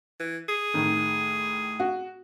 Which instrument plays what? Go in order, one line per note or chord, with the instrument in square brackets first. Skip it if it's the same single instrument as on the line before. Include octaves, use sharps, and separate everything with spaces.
[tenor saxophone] E3
G#4
[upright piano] A2 D#3
F#4